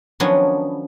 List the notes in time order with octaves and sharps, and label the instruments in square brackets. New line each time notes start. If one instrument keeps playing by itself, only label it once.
[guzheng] D#3 F3 F#3 B3 C#4 D4